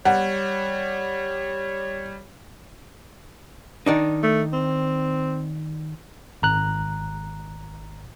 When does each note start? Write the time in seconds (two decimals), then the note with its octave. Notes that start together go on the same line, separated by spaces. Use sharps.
0.05 G3 C#5 F#5
3.86 D#3 D4 D#4
4.23 A3
4.53 C4
6.42 G#1 A#5 F#6